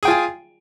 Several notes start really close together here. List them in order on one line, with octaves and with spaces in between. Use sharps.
G#4 G5 F4 G#5